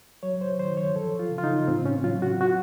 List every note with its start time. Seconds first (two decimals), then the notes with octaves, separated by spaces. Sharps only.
0.23 F#3 C#5
0.41 C5
0.59 D#3 C5
0.77 C#5
0.95 F3 A4
1.19 F4
1.32 C#3
1.38 F4
1.44 D#4
1.68 A2 C4
1.86 C#4
2.04 F#3 F4
2.22 F#4
2.41 F#4